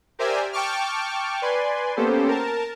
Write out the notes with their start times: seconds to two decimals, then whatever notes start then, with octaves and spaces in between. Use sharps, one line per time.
0.19 G4 A#4 C5 D5 E5 G#5
0.52 G5 A5 C#6 D6 F6
1.42 B4 D5 G#5 C6
1.97 A#3 B3 C#4 G4 A4 C5
2.28 A#4 A5